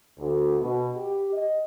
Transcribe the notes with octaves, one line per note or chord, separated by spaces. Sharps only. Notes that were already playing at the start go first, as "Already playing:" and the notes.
D2
B2
G4
D#5